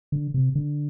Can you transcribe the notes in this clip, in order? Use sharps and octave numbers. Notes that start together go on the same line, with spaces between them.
D3
C3
D3